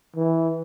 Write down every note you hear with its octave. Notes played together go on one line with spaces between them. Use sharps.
E3